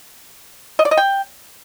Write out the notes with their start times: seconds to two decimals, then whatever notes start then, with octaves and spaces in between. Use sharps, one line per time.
0.79 D#5
0.85 D5
0.91 D#5
0.97 G5